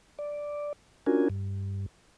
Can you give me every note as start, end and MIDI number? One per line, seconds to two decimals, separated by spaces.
0.19 0.73 74
1.06 1.28 61
1.06 1.28 62
1.06 1.28 65
1.06 1.28 66
1.06 1.28 70
1.06 1.28 80
1.30 1.86 43